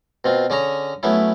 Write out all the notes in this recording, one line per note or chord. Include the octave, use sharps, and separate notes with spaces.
B2 C4 F4
D3 C#4 G#4 C#5 A#5
F#3 A3 B3 C#4 E4